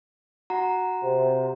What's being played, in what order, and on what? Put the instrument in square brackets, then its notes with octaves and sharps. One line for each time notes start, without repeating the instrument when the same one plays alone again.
[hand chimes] F#4 F#5 A#5
[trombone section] C3